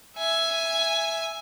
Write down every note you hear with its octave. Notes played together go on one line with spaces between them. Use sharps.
E5 G#5